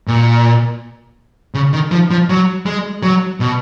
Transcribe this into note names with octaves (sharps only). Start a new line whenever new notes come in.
A#2
C#3
D#3
F3
F3
F#3
G#3
F#3
B2